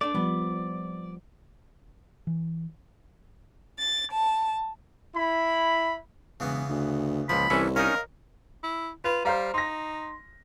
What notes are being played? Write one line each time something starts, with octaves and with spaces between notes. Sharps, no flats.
A3 D4 D5
F3 G3 B3
E3
A6
A5
E4 B5
E1 C#3 E3 B3
D2
C#2 A#2 F3 F#5 B5
C2 E3 C#4 E4 A4
C#4 D#4 A#4 D#5 F5
E4
F4 B4
G3 C5 F5 A#5
D#4 C6 A#6